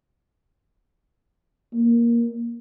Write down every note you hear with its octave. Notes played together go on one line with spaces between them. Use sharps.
A#3